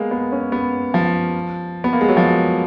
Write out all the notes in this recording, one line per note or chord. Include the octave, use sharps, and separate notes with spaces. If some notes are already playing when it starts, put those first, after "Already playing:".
Already playing: G#3 A#3 B3
B3
C#4
B3
F3
B3
A#3
G#3
F#3
F3